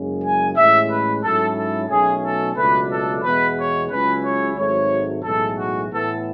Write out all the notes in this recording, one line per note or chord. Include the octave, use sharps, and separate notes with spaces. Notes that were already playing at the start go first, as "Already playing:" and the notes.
Already playing: F#1 F#2 C#3 G#3
G#5
A1 A2 G#3 C#4 E5
B4
G#2 F#3 C#4 E4 A4
A4
B1 B2 A3 C#4 G#4
A4
C#2 B2 F#3 A3 D4 B4
A4
E2 B2 G#3 B3 E4 B4
C#5
C#2 C#3 F#3 C#4 E4 B4
C#5
G#1 G#2 F#3 A3 C#5
B1 A2 E3 G#3 A4
F#4
A2 E3 B3 A4